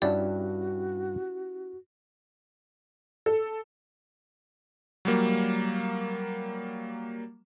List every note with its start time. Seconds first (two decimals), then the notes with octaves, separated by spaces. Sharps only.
0.02 G2 C#4 E4 F#4 G4 D5 F#5 A5
3.26 A4
5.05 F#3 G3 A#3